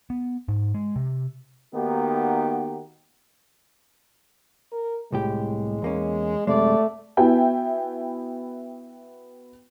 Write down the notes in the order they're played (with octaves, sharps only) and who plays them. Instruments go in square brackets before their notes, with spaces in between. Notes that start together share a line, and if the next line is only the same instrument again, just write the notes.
[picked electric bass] B3
G#2
G#3
C3
[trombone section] D#3 A#3 B3 D#4 F#4 G4
[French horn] A#4
[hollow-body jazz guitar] C2 A2 G4 [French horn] G#3
[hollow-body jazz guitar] E2 A#3 C#4
[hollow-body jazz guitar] F#2 C3 G#3 [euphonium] A3 [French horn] D5
[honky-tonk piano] B3 E4 F#4 E5 G5 G#5